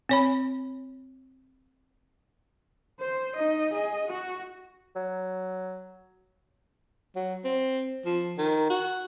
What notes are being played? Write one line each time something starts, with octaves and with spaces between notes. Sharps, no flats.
C4 C#5 B5
C5
D#4 D#5
G#4 D#5
F#4
F#3
F#3
C4
F3
D#3
F#4